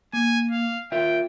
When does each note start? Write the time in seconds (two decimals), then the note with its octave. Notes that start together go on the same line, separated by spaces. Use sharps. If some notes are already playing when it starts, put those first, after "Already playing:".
0.13 A#3 G#5
0.51 F5
0.92 F4 A#4 E5 G5